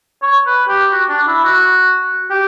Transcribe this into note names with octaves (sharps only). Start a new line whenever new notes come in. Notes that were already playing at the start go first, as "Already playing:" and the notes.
C#5
B4
G4
F#4
D4
E4
F#4
G4